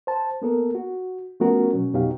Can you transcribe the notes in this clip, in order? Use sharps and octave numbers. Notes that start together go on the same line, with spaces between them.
C5 A5
A#3 B3 A4 A#4
F#4
F3 A3 B3 C#4 F#4 A#4
B2 F#3 C#4
F2 B2 F#3 D#4 G4 F5